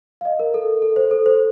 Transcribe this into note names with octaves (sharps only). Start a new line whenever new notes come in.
F5
D#5
A#4
A4
A4
C5
A4
C5